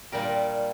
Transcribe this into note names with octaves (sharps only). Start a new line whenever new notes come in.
A#2 G3 D4 G4 A#4